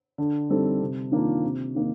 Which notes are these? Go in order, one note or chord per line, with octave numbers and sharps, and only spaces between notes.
D3
G3 C4 D#4 A4
C3
D#3 A#3 D4 F4
C3
D#3 A#3 D#4